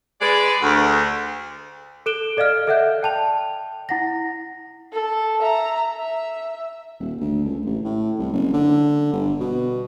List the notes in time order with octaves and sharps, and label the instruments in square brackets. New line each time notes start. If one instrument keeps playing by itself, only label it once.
[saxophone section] G#3 B4 D5
D2
[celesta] A4 F#6 D7 E7 G7
A4 D5 D#5 F5 F6
A4 D5 E5 F#5 F#6 G6
G5 A5 F7
E4 F#5 A#6
[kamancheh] A4
E5 A#5
E5
[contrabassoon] D#1
D2
C#2
A1
A2
C2
F#1
D3
G1
B2